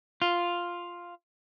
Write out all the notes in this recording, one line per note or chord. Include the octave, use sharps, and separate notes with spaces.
F4